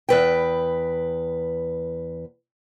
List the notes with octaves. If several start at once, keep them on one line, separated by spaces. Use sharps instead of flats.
E2 B4 G5